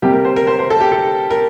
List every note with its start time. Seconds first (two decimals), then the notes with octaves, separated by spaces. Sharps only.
0.02 C3 G3 A#3 G4
0.13 A#4
0.25 C5
0.36 A#4
0.47 C5
0.59 C5
0.70 A4
0.80 G4
0.92 A4
1.30 A#4